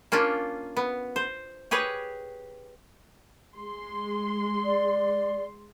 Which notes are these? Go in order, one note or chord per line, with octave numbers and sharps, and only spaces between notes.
A#3 C#4 D4 F4
B3
C5
G4 G#4 B4 C#5
G#3 C6
D5